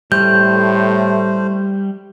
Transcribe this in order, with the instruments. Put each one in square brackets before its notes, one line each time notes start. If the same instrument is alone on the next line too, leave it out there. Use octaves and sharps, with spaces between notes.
[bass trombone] A2 [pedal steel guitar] G3 [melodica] A3 C5 [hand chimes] G6